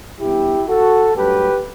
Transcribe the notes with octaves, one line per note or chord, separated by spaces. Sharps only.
G2 E3 B3 E4 G4
F#4 A4
G2 F#3 A3 G4 B4